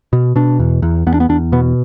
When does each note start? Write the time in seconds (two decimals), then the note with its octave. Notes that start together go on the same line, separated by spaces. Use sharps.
0.13 B2
0.36 B2 D4
0.59 E2
0.82 E2
1.07 E2 B3
1.14 D4
1.20 B3
1.29 E2 D4
1.52 B2 B3